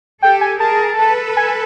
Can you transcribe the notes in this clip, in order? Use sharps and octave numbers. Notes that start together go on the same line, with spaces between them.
G4 A4 G5
G#5
G#4 A#4 A5
A4 B4
G#5